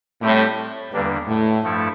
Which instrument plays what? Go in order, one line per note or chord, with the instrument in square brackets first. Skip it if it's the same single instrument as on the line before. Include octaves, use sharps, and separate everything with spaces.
[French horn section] A2 [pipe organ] G3 C4 G4
[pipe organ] E2 D3 G3 A#3 D4 [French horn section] G2
[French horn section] A2
[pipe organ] G2 F3 A3 E4 A4